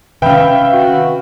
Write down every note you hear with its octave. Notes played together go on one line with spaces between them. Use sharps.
C3 D#3 C#4 B4 E5 F5 G5 B5
F#4